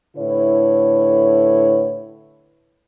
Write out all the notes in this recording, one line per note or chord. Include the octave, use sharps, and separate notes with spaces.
A2 D3 E4 B4 C#5